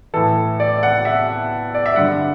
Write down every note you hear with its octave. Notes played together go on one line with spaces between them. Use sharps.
A2 E3 A4
D5
F#5
E5
D5
E5
G2 D3 F#5